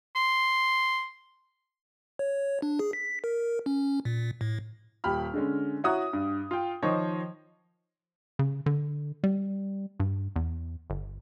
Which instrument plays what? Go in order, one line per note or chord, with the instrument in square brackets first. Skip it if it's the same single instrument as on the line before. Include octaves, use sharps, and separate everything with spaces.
[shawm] C6
[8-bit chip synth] C#5
D4
G#4
B6
A#4
C#4
A#2
A2
[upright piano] D#1 G4 B5 F6
D3 G#3 C#4
E4 F#4 C#5 F#5 A#5 D#6
G2
F4 G5
D#3 F3 C5 C#5 D#5
[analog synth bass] C#3
D3
G3
G2
E2
G1